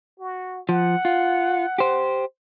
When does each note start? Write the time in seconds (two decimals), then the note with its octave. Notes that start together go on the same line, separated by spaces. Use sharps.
0.19 F#4
0.69 F3 F#5
1.05 F4
1.78 G4 C5